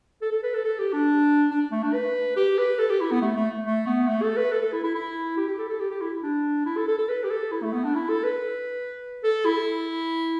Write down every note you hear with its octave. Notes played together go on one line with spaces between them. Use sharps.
A4
A4
B4
A4
A4
G4
D4
D4
A3
D4
B4
G4
B4
A4
G4
E4
B3
A3
A3
A3
B3
A3
A4
B4
A4
A4
E4
E4
E4
G4
G4
A4
A4
G4
G4
E4
D4
E4
A4
A4
A4
B4
G4
A4
E4
A3
B3
D4
E4
A4
B4
A4
E4